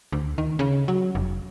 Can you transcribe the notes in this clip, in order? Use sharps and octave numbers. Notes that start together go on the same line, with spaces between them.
D2
D#3
C#3
F#3
F1